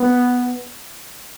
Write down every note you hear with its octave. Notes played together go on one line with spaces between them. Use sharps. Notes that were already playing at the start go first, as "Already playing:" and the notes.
Already playing: B3